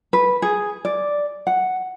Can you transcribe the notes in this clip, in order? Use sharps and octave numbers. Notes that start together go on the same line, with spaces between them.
B4
G#4
D5
F#5